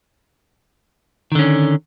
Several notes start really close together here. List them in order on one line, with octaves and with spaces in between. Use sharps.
D#3 D3 C#4